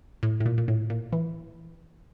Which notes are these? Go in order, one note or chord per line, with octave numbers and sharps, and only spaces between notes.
A2
A2
A#2
A#2
A2
A#2
E3